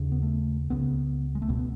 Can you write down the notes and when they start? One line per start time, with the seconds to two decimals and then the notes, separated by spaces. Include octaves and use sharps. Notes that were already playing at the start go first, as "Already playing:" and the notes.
Already playing: D#2 C#3
0.12 B3
0.22 A3
0.70 C#2 C#3 B3
1.35 G#3
1.42 A3
1.48 C#2 B2 B3
1.59 B3